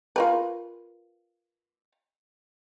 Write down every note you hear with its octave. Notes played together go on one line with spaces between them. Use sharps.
F4 A#4 B4